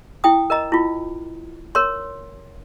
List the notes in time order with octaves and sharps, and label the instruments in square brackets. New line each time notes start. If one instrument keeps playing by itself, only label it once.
[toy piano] E4 G5 D#6
A#4 D#5 A#5
E4 F4
A#4 C#5 C6